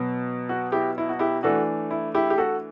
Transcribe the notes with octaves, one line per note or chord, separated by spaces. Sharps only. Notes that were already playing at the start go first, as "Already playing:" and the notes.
Already playing: B2 F#3 B3
F#4
E4 G4
E4
F#4
E4 G4
E3 A3 D4 F#4 A4
E4
E4 G4
G4
F#4 A4